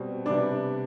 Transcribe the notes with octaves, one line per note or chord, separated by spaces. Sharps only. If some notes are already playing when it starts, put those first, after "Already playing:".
Already playing: B2 G3 C4
C3 G3 B3 D4 D6